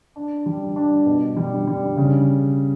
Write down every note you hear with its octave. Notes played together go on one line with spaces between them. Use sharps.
D4
G3
D4
B2
G3
G3
C#3